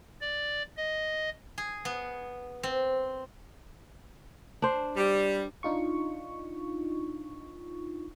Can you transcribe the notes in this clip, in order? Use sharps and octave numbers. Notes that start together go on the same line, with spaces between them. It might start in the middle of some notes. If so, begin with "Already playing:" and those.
D5
D#5
G#4
B3
C4
D4 C5
G3
D4 D#4 F4 C#6